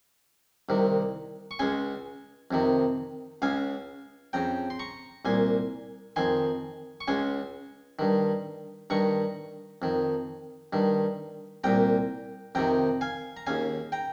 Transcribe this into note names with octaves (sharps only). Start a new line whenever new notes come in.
C2 C3 D#3
C#6
C#2 C#3 G#5 C6
F2 C3 D#3
C#2 C#3 F5 G#5
F2 C#3 G5 A#5
C6
A#5 C#6
C2 A#2 G#5 C6
F2 D#3 G#5 C6
C#6
C#2 C#3 G#5 C6
G2 D#3
G2 D#3 A#5 C#6
F2 D#3
G2 D#3
C2 A#2 G5 A#5
F2 C3 D#3 G5 A#5
F5 G#5
A#5
D#2 C#3 F5 G#5
G5 A#5